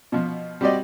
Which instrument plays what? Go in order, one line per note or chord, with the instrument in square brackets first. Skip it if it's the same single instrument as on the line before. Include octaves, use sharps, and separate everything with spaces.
[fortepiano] B2 F3
G3 C4 F#4 G4 D5 D#5